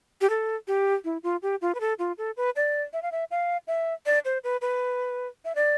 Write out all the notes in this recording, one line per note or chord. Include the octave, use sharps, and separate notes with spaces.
G4
A4
G4
E4
F4
G4
F4
B4
A4
F4
A4
B4
D5
E5
F5
E5
F5
E5
D5
C5
B4
B4
E5
D5